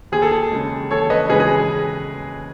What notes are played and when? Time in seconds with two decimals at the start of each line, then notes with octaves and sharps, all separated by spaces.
0.12 D#2 G#4
0.22 A4
0.31 G#4
0.52 C#3 G#3
0.91 D#2 A4 C#5
1.10 B4 D#5
1.29 C#3 G#3 G#4 B4
1.40 G#4